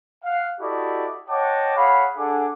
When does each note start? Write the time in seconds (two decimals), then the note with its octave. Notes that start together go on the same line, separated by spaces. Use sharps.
0.24 F5 F#5
0.61 E4 F#4 G4 A4 D5 D#5
1.29 C#5 D#5 F#5 G5 A5 D6
1.76 G#4 C#5 F5 F#5 B5
2.17 D4 G#4 A4 F#5 G#5 D6